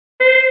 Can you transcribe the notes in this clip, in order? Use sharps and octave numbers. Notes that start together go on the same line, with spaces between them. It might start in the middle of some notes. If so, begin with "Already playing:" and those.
C5